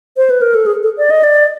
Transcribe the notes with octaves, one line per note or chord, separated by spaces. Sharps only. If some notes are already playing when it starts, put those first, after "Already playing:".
C5
B4
A#4
A4
G#4
A4
D5
D#5
D5